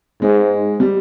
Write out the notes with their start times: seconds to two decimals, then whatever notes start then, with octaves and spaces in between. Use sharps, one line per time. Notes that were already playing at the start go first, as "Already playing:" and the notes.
0.22 G#2 G#3
0.80 G3